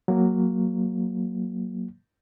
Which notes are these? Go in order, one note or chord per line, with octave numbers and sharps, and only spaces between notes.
F#3 A#3